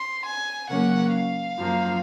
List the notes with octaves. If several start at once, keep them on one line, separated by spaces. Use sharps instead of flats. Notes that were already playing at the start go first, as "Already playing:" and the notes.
Already playing: C6
G#5
C#3 F#3 A#3 C#4 F#5
F5
F#2 F3 A#3